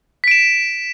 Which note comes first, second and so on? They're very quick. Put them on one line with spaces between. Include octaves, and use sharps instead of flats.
B6 D7 E7